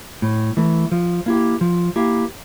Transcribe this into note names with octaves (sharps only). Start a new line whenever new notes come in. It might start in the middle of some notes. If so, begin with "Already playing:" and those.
A2
E3 A3
F3
A#3 E4 G4
F3
A#3 E4 G4